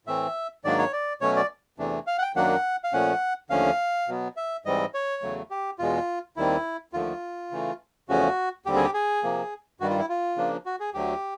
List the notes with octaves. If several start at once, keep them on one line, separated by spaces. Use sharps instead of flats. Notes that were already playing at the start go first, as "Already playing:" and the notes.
A2 E3 A3 C4 E5
G#2 D#3 F#3 A#3 D4 D5
C#5
D5
B2 F#3 A3 C#4 C#5
D5
E2 C3 E3 A3 D4
F5
F#5
G5
F#2 D#3 F#3 A#3 D4 F#5
F5
A#2 F3 A3 C#4 F#5
D#2 D3 F3 A3 C#4 F5
B2 F#3 B3
E5
G#2 E3 G3 C4 D#5
C#5
E2 C#3 F#3 A3
G4
E2 B2 G#3 F4
D#2 D#3 G3 C4 E4
D#2 D3 F3 A3 F4
C#3 E3 A3
E2 C#3 F3 A3 C#4 F#4
D#2 D3 G3 C4 G4
G#4
G4
G#4
C3 F3 A#3
G2 D#3 G3 F#4
F4
E4
F4
C#3 F3 A#3 D4
F#4
G#4
D2 D3 F#3 A3 G4